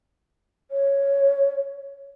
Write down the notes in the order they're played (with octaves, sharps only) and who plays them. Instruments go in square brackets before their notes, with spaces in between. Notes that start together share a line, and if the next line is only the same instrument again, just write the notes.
[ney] C#5